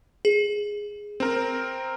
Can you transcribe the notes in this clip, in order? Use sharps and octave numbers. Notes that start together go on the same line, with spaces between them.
G#4
C4 A#4